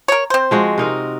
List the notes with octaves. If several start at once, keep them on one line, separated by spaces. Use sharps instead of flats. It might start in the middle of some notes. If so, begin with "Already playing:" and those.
A#4 C#5
C4 C5
F3 G#3 F#4
C3 D#4 A#4